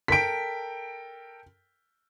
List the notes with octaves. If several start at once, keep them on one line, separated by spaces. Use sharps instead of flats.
A4 A#4 G5 B6 D7